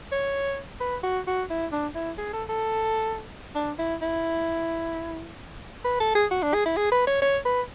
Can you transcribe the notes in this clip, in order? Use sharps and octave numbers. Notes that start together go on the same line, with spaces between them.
C#5
B4
F#4
F#4
E4
D4
E4
G#4
A4
A4
D4
E4
E4
B4
A4
G#4
F#4
D4
G#4
E4
G#4
B4
C#5
C#5
B4